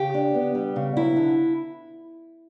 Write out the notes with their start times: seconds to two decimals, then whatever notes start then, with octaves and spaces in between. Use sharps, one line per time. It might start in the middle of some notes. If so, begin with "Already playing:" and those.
Already playing: C#3 G4
0.14 D4
0.34 B3
0.55 G3
0.76 C#3
0.96 F#3 E4
1.16 D3